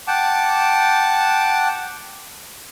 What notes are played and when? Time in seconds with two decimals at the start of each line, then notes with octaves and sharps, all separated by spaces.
0.07 F#5 G5 A5 D6